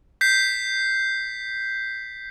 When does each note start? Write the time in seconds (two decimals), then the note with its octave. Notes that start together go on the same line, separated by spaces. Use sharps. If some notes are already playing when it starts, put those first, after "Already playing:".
0.21 G6 B6 C7